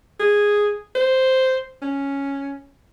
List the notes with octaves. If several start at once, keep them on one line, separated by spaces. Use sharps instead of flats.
G#4
C5
C#4